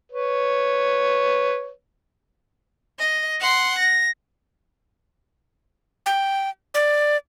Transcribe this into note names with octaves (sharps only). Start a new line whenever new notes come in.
B4 C#5
D#5
F#5 C6
A#6
G5
D5